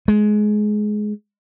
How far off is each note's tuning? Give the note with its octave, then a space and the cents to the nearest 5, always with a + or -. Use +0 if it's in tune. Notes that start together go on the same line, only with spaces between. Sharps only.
G#3 +20